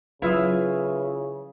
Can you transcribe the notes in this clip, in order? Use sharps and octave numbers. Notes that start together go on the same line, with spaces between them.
C#3 F#3 E4 F4 B4 E5 D#6